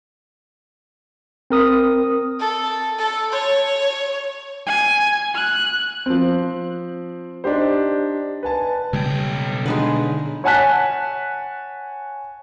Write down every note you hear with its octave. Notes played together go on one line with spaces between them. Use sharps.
C4 A#4 D#6
A4
A4
C#5
G#5
F#6
F3 C4
D4 D#4 G4 C5
B4 G#5 A5
B1 C#3 G3 G5
D3 G#3 D#4 B4
C#5 F#5 G#5 A5 F#6 B6